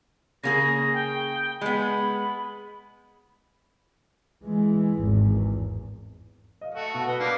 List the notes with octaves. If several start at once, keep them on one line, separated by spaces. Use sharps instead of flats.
C#3 A#3 G#4 A#6
G5
G#3 B3 B5
E3 G#3
G#1 E2
D#5 F5
A3 F#4
B2 A5
B4 D#5
G3 A#3 D4